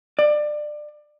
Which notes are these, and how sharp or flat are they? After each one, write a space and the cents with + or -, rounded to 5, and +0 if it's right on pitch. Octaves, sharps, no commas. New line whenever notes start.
D5 +25